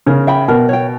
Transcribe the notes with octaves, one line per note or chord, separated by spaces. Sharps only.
C#3 A#4
E5 G5 B5
B2 A#4
C#5 G5